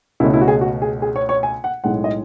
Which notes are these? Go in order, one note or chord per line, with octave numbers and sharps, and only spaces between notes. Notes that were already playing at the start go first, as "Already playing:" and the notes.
C#2 B2 A3 C#4 E4
E4
F#4
G#4
F#4
G#4
G#4
C#5
C#5
G#5
F#5
B1 A2 G#3 F#5
D#5